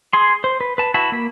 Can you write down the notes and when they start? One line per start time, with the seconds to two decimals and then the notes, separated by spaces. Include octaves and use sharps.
0.13 G#4 C6
0.44 C5
0.61 B4
0.78 B4 A5
0.94 E4 F#4 A5 B5
1.12 A#3 B5